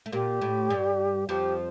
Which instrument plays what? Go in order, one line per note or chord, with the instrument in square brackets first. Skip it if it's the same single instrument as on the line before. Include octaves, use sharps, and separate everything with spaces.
[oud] A3
[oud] A#2 A#3 [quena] G4
[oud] A2 A3
G2 G3
[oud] F2 F3 [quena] G4